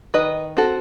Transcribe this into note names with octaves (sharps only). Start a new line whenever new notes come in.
D#3 B4 D#5
C4 F#4 A4